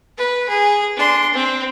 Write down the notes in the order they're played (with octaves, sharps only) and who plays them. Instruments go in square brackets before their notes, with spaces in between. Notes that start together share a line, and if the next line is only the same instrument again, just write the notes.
[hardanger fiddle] B4
G#4
D4 C6
C4